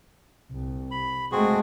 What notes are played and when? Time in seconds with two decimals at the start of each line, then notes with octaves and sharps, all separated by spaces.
0.51 C2
0.91 B5
1.32 G#3 A3 C4 F#4 G#4